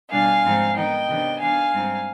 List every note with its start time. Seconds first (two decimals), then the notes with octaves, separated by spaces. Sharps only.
0.11 B2 G3 D4 F5 G#5
0.43 G#2 F3 C4 D#4
0.75 D#3 B3 D#4 D#5 G5
1.08 C3 D#3 B3 D4
1.40 D#3 B3 D4 F5 G#5
1.73 G#2 G3 C4 D#4